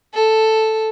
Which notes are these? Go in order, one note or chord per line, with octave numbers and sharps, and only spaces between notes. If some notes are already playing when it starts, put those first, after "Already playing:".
A4